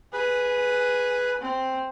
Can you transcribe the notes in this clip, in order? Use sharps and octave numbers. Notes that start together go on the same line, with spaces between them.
G#4 B4
C4